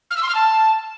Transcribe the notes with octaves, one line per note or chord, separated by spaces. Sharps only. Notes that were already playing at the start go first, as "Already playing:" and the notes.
F6
E6
C6
F6
A5